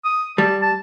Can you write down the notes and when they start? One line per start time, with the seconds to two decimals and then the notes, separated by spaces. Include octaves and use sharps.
0.05 D#6
0.38 G3 A5
0.62 A5